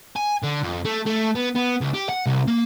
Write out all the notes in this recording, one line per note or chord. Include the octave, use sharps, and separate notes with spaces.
G#5
D3
F2
A3
A3
B3
B3
C#2
G4
F#5
C2
A#3